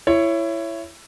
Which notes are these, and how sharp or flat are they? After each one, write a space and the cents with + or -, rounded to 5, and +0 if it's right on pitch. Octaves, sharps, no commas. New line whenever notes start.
E4 +20 C#5 +0